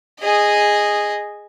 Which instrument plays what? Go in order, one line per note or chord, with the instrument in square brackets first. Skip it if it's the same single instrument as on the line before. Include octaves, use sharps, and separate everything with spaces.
[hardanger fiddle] G#4 D#5